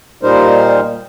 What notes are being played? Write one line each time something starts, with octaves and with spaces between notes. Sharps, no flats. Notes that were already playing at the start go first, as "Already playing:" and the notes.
A#2 G3 D#4 A#4 C5